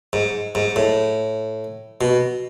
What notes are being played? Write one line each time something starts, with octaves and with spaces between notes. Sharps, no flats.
G#2
G#2
A2
B2